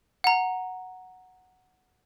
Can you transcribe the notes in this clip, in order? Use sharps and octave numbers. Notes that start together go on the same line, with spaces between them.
F#5 A#5